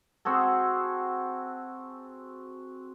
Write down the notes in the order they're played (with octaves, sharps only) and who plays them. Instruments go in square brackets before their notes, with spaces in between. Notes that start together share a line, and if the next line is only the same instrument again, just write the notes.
[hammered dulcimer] C4 F#4 G#4 A4